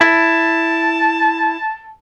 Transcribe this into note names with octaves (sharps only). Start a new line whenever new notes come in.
E4 A5